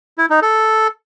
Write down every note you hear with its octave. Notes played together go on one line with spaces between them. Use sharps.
E4
D#4
A4